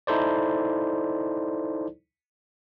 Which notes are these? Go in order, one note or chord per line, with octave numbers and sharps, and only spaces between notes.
D#4 E4 A4 C5 D5